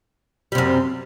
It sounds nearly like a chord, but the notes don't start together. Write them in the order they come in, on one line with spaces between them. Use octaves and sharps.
G3 C3 F#2